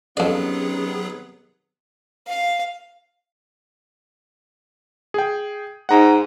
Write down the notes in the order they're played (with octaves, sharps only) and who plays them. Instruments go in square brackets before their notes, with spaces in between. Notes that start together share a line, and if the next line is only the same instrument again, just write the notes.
[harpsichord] F2 D5 [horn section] C3 D#3 B3 [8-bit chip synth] F#3 G#4 [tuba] C#4
[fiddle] F5
[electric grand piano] G#4 G5
[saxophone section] G#2 [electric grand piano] F#5 A#5